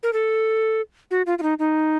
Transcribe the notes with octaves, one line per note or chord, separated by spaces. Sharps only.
A#4
A4
F#4
F4
F4
D#4
D#4